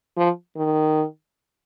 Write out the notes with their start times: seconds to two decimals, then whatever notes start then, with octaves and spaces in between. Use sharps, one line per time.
0.17 F3
0.57 D#3